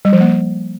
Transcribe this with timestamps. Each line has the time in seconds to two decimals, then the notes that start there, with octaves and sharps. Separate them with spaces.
0.05 G3
0.13 F3
0.21 A#3